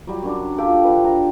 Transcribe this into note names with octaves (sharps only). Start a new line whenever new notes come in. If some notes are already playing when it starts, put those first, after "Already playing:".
F#3 G3
F#2 D4
F4 G4 A4 G5
D3 B4
A#5